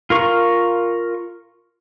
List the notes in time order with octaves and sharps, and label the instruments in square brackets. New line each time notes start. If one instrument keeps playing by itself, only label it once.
[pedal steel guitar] F4 A#4 C#6